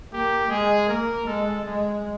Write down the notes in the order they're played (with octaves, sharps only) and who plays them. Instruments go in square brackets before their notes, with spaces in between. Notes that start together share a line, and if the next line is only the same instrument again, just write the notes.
[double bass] A#3 [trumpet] G4
[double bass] G#3 [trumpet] G#4
[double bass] A#3 [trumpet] A#4
[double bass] G#3 [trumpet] A4
[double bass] G#3